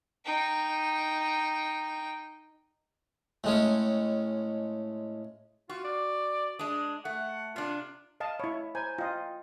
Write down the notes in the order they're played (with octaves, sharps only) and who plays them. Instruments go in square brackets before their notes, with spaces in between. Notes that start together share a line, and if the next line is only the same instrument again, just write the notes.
[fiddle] D#4 G5
[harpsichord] A2 G#3 C#4
[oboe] F4 [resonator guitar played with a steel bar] F#4
[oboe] D5
[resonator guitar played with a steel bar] G#3 D4 [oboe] D#6
[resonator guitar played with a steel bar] A3 [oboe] F#5
[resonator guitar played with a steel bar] C3 D4 [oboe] F4
[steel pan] D#5 F5 A5
[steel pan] E4 C#5 [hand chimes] B5
[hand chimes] C5 A#5 G6 [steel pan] G#5
[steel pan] F4 D#5 [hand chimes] G5